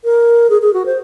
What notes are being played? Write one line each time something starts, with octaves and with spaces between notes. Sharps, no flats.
A#4
G#4
G#4
F#4
C5